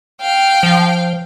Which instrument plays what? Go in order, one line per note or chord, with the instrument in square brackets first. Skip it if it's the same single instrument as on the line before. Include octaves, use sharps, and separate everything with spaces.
[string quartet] F5 G5
[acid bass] F3